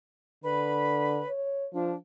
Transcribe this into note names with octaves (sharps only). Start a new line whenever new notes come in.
D3 B4 B5
C#5
F3 D4